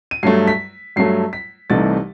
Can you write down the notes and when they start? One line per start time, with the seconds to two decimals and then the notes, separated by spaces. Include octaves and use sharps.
0.11 D#7
0.23 G2 F#3 A3 C7
0.47 B6
0.96 G2 F#3 A3 C7
1.33 B6
1.70 C2 C3 E3 A3 D#4 A6